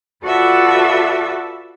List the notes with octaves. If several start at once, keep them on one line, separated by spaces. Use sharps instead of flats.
F4 F#4 A4 B4 D5 E5